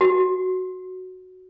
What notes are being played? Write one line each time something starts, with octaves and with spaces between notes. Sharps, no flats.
F#4